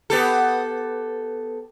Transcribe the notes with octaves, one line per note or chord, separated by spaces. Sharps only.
B3 G4 A4